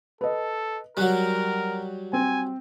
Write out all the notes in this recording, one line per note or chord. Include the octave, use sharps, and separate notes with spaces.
A4 B4 D#5
F#3 G3 A#4 F#6
C4 G#5